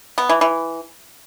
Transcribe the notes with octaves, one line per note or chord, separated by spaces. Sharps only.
B3
E3
E3